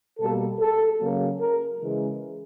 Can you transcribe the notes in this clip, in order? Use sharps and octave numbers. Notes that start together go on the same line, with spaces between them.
B2 G3 A#3 A4
A4
C#3 F#3 A#3
A#4
C#3 E3 G#3